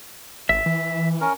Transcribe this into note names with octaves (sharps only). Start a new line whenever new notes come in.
G#1 E5
E3
C#4 A#4